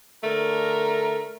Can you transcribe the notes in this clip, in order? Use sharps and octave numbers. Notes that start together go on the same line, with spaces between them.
D3 A3 A#4